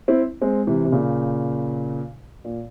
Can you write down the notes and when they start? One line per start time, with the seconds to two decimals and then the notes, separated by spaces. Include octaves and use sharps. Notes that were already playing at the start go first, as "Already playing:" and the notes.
0.08 C4 E4
0.42 G#3 C4
0.67 C3 E3
0.85 C3
0.92 A#2 C#3
2.45 A#2